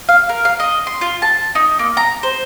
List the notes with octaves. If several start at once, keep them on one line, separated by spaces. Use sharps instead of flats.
F5
A#4
F5
D#5
C6
F4
A5
D#4
A#3
A#5
C5